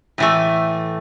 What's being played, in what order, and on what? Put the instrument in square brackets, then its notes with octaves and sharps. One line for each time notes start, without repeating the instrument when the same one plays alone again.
[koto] A2 E3 A3